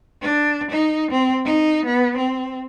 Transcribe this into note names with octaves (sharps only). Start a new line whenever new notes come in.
D4
D#4
C4
D#4
B3
C4